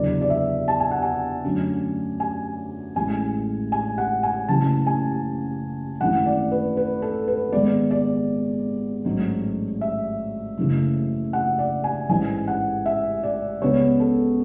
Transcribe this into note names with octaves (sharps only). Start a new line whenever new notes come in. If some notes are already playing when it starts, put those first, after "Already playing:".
Already playing: F#1 E2 D3 F#3 B3 D5
D5
E5
A5
G#5
F#5
G#5
F#2 D3 F#3 A3
G#5
A1 A2 G#3 G#5
G#5
F#5
G#5
F#1 F#2 C#3 E3 A3 A5
G#5
G#1 F#2 E3 A3 F#5
D5
B4
B4
A4
B4
G#1 G#2 G#3 B3 D5
D5
A1 G#2 F#3 A3
E5
F#1 F#2 C#3 E3 A3
F#5
D5
G#5
A1 G#2 E3 G#5
F#5
E5
D5
C#2 C#3 G#3 B3 C#5
A4